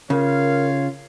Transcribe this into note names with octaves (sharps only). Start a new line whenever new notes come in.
C#3 F4 A#4 C#5 F5